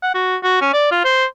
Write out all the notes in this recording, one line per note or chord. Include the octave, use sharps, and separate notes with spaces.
F#5
F#4
F#4
C#4
D5
F4
C5